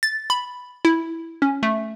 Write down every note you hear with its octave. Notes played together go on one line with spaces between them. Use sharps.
A6
B5
E4
C#4
A3